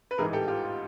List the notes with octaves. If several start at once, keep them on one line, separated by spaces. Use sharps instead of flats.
B4
A1 G#2 E3 G#4 A#4
G4 A4
F4 G4
F4